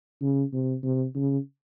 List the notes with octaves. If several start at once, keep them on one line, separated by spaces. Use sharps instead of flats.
C#3
C3
C3
C#3